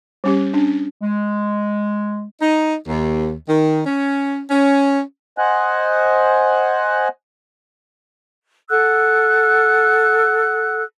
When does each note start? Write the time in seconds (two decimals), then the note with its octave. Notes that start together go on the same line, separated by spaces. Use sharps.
0.24 G3 C#4 G4
0.54 C#4 D4
1.01 G#3
2.42 D#4
2.88 D#2
3.49 D#3
3.87 C#4
4.51 C#4
5.38 C5 D#5 F#5 G#5 F#6
8.69 A4 F#5 E6 F#6